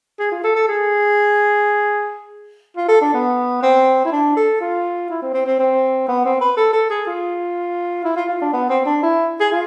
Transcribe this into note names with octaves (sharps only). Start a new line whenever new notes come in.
G#4
F4
A4
A4
G#4
F4
A4
D4
B3
C4
E4
D4
A4
F4
E4
C4
C4
C4
C4
B3
C4
B4
A4
A4
G#4
F4
E4
F4
F4
D4
B3
C4
D4
E4
G#4
F4